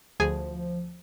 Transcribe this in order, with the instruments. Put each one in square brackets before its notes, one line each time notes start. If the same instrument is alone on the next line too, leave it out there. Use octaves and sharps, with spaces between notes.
[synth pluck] D2 G#4 G#5 [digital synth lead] F3